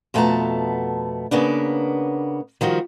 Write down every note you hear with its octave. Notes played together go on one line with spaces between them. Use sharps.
F2 B2 A3 B3 A5 A#5
C#3 A#3 B3 D4
D#3 F3 G3 F#4